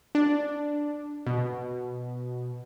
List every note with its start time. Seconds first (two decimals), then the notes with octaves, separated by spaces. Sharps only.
0.15 D4
1.27 B2